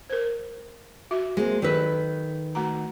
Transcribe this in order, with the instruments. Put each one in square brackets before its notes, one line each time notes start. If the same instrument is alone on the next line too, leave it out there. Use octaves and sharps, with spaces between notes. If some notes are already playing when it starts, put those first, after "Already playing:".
[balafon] A#4 C5
F#4 E5
[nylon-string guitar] G#3 A#3 C4
[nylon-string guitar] D#3 A4 B4 [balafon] F#3 G4
[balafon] A3 F#4 A#5